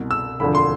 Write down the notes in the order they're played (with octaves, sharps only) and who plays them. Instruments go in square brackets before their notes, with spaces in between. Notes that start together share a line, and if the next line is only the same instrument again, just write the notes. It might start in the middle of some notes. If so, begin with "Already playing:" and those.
Already playing: [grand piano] C2 B2
E6
E1 D2 D3 F3 B5
C6